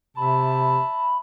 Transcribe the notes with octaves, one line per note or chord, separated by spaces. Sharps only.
C3 E5 A5 B5